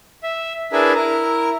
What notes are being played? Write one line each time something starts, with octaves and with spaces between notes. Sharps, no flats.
E5
D4 E4 G#4 A#4 B4 E5
E4 A#4 A#5